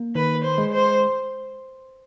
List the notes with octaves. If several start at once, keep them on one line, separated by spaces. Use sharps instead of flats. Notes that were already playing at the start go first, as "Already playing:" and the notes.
Already playing: A#3
D#3 B4
C5
G#3
C5